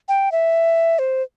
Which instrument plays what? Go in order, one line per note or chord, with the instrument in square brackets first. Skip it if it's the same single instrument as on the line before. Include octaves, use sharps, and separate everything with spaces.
[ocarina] G5
E5
C5